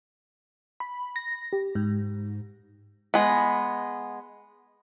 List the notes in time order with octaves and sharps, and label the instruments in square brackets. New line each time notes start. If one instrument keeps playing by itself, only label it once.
[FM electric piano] B5
A#6
G4
G#2
[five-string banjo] G#3 B3